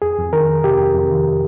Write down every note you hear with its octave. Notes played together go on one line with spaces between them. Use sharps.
F2 G#4
F2
D#3 A#4
D#3
C3 G4
F2
F2
D#3